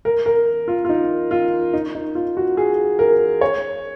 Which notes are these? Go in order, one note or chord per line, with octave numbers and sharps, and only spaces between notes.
A#4
A#4
F4
F4
D#4
F4
D#4
D#4
F4
F#4
G#4
A#4
C#5